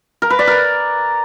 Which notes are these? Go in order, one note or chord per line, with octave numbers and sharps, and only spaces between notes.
A#4
B4
D5
A#4